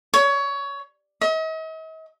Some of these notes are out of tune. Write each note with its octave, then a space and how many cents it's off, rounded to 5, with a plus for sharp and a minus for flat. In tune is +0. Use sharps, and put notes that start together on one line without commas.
C#5 +20
D#5 +45